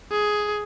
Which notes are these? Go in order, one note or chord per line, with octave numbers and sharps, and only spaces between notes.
G#4